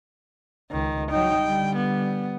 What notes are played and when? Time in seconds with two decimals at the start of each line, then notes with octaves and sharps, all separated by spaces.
0.71 C#2 D#3
1.11 F#3 D#4 G5
1.43 D3 G3
1.76 B3